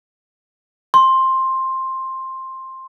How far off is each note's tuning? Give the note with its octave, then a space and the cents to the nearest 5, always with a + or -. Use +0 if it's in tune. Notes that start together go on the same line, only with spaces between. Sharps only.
C6 +10